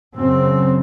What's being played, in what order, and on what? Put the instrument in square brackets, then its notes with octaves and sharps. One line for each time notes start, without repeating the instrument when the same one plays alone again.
[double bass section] F#2 C#3 C4